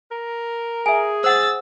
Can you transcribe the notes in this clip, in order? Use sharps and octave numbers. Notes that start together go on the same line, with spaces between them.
A#4
G#4 E5 G#5
C5 F#5 E6 A6